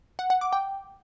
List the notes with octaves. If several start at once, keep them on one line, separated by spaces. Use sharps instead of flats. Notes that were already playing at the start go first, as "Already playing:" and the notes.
F#5
F#5
D6
G5